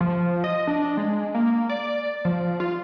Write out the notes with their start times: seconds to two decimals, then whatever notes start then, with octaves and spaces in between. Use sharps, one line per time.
0.01 F3
0.44 D#5
0.67 D4
0.97 G#3
1.35 A#3
1.70 D5
2.25 F3
2.60 F4